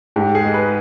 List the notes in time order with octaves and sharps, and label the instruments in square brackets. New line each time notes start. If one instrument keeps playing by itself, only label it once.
[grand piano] G#2 G4
G#4
G#3
B4